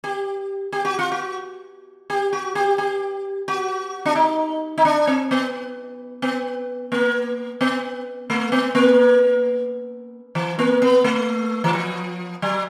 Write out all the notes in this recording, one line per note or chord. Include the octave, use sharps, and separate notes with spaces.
G4
G4
F#4
F4
F#4
G4
F#4
G4
G4
F#4
D4
D#4
D#4
D4
C4
B3
B3
A#3
B3
A3
B3
A#3
E3
A#3
B3
A3
E3
F3
F#3